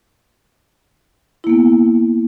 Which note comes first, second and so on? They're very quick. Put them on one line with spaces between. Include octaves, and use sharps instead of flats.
E4 A#3 B3